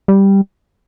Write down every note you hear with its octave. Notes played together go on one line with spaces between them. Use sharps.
G3